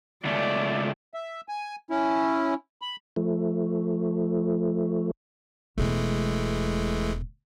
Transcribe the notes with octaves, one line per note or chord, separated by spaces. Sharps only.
C#2 A3 D5
E5
G#5
C#4 E4
B5
F3 A3
E1 B2 E3 G#3 A3